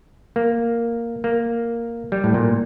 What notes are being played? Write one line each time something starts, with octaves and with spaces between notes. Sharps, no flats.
A#3
A#3
G3
A2
A#2